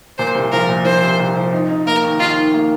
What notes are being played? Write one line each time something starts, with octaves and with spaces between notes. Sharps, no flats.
A#2 C5
C2
F3 A#4
A#2
F3 C5
C2
C2
F3
D#4
D#4
A#3 A#4
D#2
D#4 F4
D#3
A#3